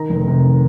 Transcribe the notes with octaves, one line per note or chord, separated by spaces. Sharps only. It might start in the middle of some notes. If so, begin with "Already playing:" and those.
Already playing: D#3 A#5
F1
C3
D#3